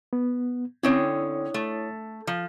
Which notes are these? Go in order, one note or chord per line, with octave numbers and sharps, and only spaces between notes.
B3
D3 C4 C#4 E4 C#5 D#6
A3
F3